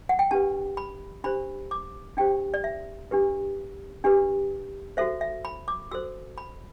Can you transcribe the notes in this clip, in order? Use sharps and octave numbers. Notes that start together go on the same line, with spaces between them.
F#5
G5
D4 G4 B4 A5
B5
D4 G4 C5 B5
D6
D4 G4 C5 G5
D5
E5
D4 G4 B4
D4 G4 B4
F#4 A4 C5 E5
E5
B5
D6
F#4 A4 C5 E6
B5